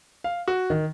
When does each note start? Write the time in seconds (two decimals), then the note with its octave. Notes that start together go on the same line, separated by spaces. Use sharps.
0.24 F5
0.48 F#4
0.70 D#3